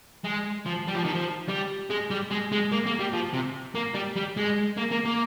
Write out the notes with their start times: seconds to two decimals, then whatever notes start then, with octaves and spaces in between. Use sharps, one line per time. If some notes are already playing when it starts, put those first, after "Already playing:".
0.25 G#3
0.66 F3
0.88 G3
0.95 F3
1.05 D#3
1.14 F3
1.48 G3
1.90 G#3
2.11 G3
2.31 G#3
2.52 G#3
2.72 A#3
2.86 A#3
2.99 G3
3.13 F3
3.33 C3
3.75 A#3
3.95 G3
4.16 G3
4.37 G#3
4.77 A#3
4.92 A#3
5.05 A#3